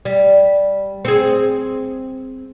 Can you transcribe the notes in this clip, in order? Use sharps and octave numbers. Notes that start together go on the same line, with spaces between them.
G3
C4 G#4